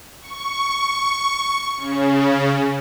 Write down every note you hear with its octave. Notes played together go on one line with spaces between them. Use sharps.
C#6
C#3